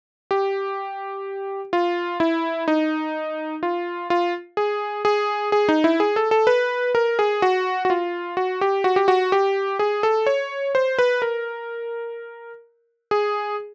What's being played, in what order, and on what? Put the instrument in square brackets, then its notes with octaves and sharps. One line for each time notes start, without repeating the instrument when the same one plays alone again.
[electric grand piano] G4
F4
E4
D#4
F4
F4
G#4
G#4
G#4
D#4
E4
G#4
A4
A4
B4
A#4
G#4
F#4
F#4
F4
F#4
G4
F#4
G4
F#4
G4
G#4
A4
C#5
C5
B4
A#4
G#4